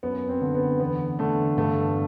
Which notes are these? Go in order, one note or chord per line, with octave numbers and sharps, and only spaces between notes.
F#2 B3
C4
D3
B3
E2 B3
D3 A3
G2 A3